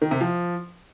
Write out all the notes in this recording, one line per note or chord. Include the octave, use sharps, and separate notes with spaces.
D#3
C3
F3